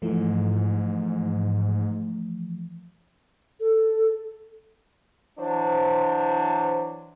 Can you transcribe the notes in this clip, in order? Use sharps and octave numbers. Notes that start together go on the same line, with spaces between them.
G#2 E3 F3 A3
A4
E3 F#3 D4 C5